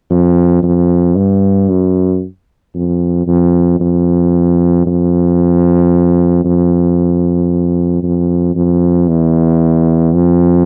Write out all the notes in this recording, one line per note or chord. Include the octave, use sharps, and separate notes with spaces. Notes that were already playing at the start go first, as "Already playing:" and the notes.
F2
F2
G2
F#2
F2
F2
F2
F2
F2
F2
F2
E2
F2